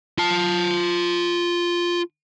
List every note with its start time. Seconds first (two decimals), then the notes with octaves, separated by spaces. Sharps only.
0.18 F4 A5